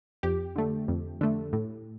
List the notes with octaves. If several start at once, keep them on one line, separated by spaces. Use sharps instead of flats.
F2 G4
D3 A3
F2
D3 A3
A2